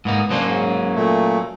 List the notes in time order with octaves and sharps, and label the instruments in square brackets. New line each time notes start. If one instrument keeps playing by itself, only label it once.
[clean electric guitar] G#2 A#3 D#4 [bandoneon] B3
[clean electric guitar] F#3 A#3 C#4 [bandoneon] D4 C5
[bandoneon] G#2
A#2 A3